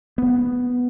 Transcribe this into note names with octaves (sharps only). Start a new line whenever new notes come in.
B3